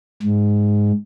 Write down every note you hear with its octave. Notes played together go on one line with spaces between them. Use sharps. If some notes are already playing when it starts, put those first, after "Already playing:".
G#2